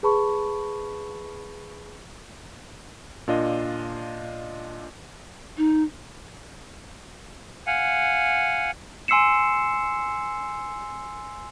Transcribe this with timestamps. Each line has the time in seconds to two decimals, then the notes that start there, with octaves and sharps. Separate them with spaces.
0.03 G#4 B4 A5 B5 C#6
3.28 A#2 D4 F4 D#5
5.58 D#4
7.67 F5 F#5 G#5
9.08 G#5 C6 E6 C7 C#7 E7